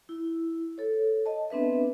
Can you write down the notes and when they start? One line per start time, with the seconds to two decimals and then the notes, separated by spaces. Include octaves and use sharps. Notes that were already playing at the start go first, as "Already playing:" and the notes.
0.09 E4
0.78 A4 C#5
1.26 D#5 A5
1.50 B3 C4 D4 B4 E5